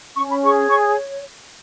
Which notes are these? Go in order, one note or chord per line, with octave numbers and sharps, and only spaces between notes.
C#4 C#6
B5
G#4 C#6
C#5 C#6